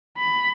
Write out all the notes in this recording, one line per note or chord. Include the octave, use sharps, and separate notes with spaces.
B5